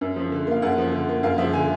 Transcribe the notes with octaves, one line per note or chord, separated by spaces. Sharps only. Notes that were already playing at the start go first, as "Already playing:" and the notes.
F#2
F3
D3
A#3 F5
F#2 F#5
F3
D3
A#3
F#2 F5
F3 E5
D3 G#5